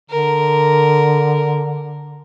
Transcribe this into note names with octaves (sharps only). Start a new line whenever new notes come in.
D3 A#4